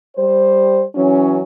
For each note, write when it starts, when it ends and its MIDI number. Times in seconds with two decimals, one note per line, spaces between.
0.17 0.83 55
0.17 0.83 72
0.95 1.40 52
0.95 1.40 54
0.95 1.40 61